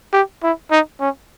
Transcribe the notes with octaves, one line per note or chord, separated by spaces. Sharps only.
G4
E4
D#4
C#4